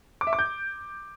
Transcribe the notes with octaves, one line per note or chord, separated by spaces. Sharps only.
D6
E5
D6
G6